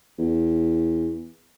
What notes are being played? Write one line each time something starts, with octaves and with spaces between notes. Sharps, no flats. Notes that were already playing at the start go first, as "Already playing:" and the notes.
E2